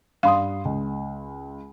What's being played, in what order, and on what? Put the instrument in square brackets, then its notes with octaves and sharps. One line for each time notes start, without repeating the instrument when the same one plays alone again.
[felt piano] G2 C6 D#6 [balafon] F5
[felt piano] C#2